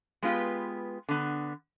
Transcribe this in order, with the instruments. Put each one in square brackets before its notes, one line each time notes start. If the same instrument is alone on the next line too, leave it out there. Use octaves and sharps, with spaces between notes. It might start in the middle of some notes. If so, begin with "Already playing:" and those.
[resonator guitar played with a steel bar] G#3 B3 F4 G4 B4
D3 B3